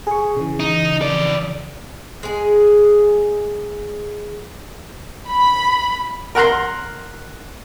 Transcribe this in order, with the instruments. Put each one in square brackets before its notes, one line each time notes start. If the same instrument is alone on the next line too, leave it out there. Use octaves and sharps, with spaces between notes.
[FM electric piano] G#4 C#6
C#3 E3
[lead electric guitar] D#4
F2 D5
[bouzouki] G#3 G#4
[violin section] B5
[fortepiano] A#4 F#5 A#5 C6